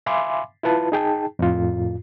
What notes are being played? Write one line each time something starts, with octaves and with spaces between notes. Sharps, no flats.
E5 F5 G#5 B5 C6 D6
E4 F4 B4 A5
D#4 G#4 G5 A5
F2 A2 F4